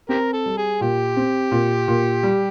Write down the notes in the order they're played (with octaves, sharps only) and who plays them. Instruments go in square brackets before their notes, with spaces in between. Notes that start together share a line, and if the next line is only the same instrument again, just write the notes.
[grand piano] C4 [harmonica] G4 A#4
[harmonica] A4
[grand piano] G3
[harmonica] G#4
[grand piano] A#2 [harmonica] G4
[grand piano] C4
A#2
A#2
G3